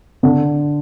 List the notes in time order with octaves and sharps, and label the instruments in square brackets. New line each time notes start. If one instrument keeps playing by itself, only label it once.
[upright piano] D3